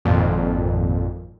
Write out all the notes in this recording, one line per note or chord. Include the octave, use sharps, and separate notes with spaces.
G#1 F2 A#2